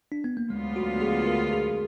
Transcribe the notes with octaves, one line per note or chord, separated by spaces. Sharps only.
D4
B3
A#3
D2 D3 F#3 G#3 B3 F4
F#4
G#4
A#4
G#4